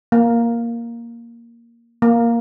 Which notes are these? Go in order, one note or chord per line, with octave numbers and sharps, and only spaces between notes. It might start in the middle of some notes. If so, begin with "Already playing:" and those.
A#3
A#3